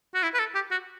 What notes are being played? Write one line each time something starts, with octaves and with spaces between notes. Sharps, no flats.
F#4
E4
B4
A4
G4
F#4